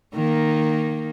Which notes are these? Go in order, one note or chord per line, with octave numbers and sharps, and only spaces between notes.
D#3 A#3 D#4